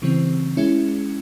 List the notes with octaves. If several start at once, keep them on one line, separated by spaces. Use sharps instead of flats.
C#3 E3 G3 C4
G#3 C#4 E4